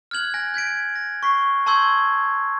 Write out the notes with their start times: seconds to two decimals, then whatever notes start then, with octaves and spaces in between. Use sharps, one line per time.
0.11 F6 F#6 G#6 F#7
0.34 G#5 G6 A#6
0.54 G6 G#6 B6 D7
0.96 A#6
1.23 C#6 B6 C7
1.66 A5 C6 C#6 E6 G6 G#6